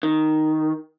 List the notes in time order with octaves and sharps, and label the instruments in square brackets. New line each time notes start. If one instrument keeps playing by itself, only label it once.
[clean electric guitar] D#3